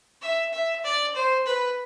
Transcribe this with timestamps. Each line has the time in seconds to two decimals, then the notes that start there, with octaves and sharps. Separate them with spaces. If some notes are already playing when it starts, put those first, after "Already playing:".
0.22 E5
0.53 E5
0.84 D5
1.15 C5
1.46 B4